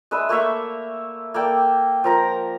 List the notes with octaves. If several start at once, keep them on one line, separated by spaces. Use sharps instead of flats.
G#3 D4 B4 E5
A3 A#3 C#5 E5
A#3 A4 D5 G5
F3 A#4 A#5